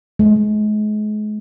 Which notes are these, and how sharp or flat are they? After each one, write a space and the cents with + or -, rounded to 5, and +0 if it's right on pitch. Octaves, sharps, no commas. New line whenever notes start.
G#3 +35